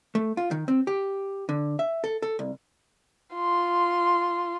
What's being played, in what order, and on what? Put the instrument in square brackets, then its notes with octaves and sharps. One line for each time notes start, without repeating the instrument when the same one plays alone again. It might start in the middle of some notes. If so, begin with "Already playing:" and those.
[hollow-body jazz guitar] A3
F4
D#3
C4
G4
D3
E5
A4
A4
C2
[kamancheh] F4 C6